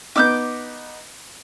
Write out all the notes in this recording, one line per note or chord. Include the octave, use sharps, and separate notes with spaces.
B3 D#4 D6 E6 G6